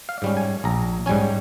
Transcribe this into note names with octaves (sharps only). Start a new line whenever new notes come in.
F5
G#2 G3 C#4
G#5
A#1 A#5
G#2 G3 C#4 G#5